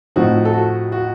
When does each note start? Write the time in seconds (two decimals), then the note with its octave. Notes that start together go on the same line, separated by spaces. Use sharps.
0.16 A2 F3 C4 D#4 F#4
0.45 A4
0.54 F#4
0.92 F#4